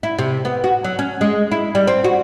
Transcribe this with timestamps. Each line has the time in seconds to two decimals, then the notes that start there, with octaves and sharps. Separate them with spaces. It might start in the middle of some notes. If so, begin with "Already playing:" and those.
0.03 E4
0.19 C3
0.45 B3
0.64 F#4
0.84 F#3
0.99 C#4
1.21 G#3
1.52 E4
1.75 G3
1.88 C4
2.04 F#4